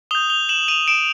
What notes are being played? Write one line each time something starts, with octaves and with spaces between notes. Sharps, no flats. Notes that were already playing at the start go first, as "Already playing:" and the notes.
D#6 G6 F7 G7
F7 G7
E7 F#7
D#7 F7
D7 E7